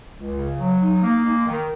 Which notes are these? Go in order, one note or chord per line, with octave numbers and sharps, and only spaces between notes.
C#2
C#3
F#3
D#4
A#3
G#3
D#3